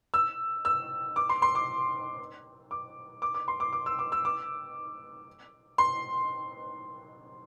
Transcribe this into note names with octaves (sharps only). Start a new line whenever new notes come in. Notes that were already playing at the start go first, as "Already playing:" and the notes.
E6
E6
D6
C6
C6
D6
D6
D6
D6
C6
D6
D6
E6
D6
E6
D6
C6